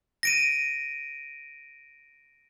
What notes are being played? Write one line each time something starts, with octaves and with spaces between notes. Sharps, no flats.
A#6 D7 D#7